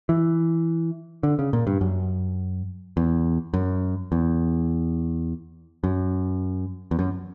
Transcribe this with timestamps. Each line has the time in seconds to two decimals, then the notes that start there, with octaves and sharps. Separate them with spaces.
0.09 E3
1.23 D3
1.39 C#3
1.53 A#2
1.67 G2
1.81 F#2
2.97 E2
3.54 F#2
4.12 E2
5.84 F#2
6.91 E2
6.99 F#2